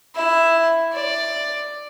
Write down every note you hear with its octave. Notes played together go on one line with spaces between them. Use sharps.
E4 E5
D5